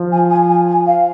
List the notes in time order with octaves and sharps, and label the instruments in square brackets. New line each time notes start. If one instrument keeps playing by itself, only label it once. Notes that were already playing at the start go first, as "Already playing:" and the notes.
Already playing: [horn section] F3
[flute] G#5
G#5
G#5
G#5
F5